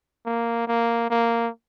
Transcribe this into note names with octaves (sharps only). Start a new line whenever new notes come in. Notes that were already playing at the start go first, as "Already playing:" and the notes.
A#3
A#3
A#3